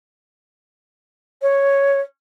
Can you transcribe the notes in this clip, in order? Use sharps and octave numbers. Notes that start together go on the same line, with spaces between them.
C#5